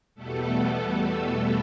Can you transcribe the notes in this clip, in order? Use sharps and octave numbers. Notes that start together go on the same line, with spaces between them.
E2 B2 G3 A3 B3 A4